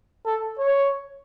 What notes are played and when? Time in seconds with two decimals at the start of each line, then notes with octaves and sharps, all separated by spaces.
0.26 A4
0.58 C#5